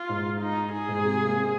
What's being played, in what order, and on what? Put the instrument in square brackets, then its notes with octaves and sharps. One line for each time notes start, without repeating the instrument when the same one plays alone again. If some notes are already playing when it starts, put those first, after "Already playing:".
Already playing: [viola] F4
[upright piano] G#2
[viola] D#4
G#4
[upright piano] G#2
C3
A#3
C4